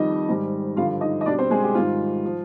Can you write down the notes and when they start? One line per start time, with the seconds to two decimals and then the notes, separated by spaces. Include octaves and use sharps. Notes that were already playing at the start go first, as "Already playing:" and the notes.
Already playing: F2 D#3 G3 D#4 D#5
0.29 G#2 D#3 G3
0.76 G2 D3 F3 F4 F5
1.01 D#4 D#5
1.21 D#5
1.26 B2 G3 D4 D5
1.39 C4 C5
1.51 G#3 G#4
1.63 G4
1.75 G#2 D#3 G3 F4
2.25 F3